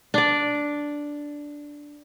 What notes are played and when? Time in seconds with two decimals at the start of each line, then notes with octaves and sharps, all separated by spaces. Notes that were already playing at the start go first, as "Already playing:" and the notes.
0.14 D4 D5